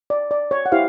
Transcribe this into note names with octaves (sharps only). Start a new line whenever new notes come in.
D5
D5
C#5
F#5
E4 G4 C5 F5